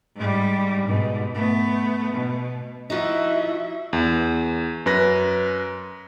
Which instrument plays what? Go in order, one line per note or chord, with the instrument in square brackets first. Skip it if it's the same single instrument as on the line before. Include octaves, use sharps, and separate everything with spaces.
[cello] G#2 G3
G#2 B2
A3 B3
B2
[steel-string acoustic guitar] F3 D#4 [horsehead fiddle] E4 E5 [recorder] F#4
[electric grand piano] E2
F#2 B4 A#6